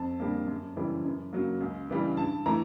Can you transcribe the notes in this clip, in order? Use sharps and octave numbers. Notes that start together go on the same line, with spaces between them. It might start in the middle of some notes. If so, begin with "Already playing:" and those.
Already playing: F2 A5
D3 G3 A#3
F#2
C#3 E3 G3
F#2
C#3 F#3 A#3
C#2
C#3 E3 G3
G2 A5
E3 A3 A#5